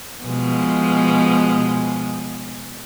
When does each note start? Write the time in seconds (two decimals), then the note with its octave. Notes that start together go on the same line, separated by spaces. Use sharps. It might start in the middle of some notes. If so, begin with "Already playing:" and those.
0.24 B2 F3 G#3